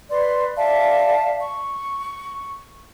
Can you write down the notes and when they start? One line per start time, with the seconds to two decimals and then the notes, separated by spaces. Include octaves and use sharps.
0.10 B4 D5 C6
0.56 D5 E5 F5 A5
1.39 C#6